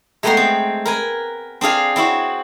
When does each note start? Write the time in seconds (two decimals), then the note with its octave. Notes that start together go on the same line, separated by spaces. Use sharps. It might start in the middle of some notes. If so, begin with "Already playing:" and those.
0.23 G#3 A3 B3 G5 A#5 C6
0.37 C4
0.85 A#4 B4 G#5
1.61 C4 D4 G#4 F5 G#5
1.96 C4 E4 F#4 C#5